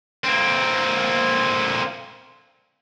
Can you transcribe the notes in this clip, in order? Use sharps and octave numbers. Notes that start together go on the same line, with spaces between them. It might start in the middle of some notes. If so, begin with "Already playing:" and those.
A#3 C4